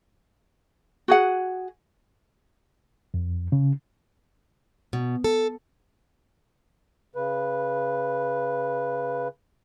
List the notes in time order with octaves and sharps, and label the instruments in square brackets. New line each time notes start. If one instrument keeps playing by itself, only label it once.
[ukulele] F#4 G#4 F#5
[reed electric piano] F2
C#3
[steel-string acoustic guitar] B2
A4
[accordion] C#3 B4